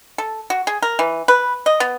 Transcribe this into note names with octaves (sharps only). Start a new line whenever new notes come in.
A4
F#4
G#4
A#4
E3
B4
D#5
B3